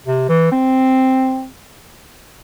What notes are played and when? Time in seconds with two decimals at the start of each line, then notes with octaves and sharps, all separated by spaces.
0.06 C3
0.29 E3
0.52 C4